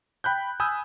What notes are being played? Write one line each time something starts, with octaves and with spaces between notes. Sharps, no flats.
G5 B5 F#6 G6
G#5 B5 D#6 E6 G6